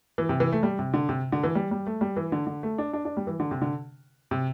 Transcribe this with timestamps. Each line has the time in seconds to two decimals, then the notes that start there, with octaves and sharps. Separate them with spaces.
0.18 E3
0.29 C3
0.40 E3
0.52 A3
0.63 G3
0.79 C3
0.93 D3
1.09 C3
1.32 D3
1.44 E3
1.55 G3
1.71 G3
1.87 A3
2.01 G3
2.17 E3
2.32 D3
2.47 D3
2.63 A3
2.78 D4
2.93 D4
3.05 D4
3.17 G3
3.27 E3
3.40 D3
3.51 C3
3.61 D3
4.31 C3